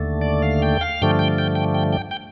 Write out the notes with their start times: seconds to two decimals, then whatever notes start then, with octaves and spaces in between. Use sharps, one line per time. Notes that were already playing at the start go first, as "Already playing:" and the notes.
Already playing: D#2 D3 A3
0.21 D5
0.42 F5
0.62 G5
0.81 F5
1.02 G2 D3 F3 A3 G5
1.19 G5
1.38 G5
1.55 G5
1.74 G5
1.93 G5
2.11 G5